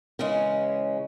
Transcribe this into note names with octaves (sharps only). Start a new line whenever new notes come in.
C#3 E3 G#3 C#4